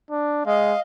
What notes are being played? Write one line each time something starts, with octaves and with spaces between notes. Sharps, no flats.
D4
G#3 D#5 F5